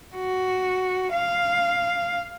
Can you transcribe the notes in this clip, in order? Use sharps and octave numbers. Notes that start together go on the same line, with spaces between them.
F#4
F5